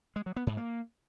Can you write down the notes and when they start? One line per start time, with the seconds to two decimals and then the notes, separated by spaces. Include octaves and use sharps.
0.16 G#3
0.26 F#3
0.36 B3
0.47 G#2
0.57 A#3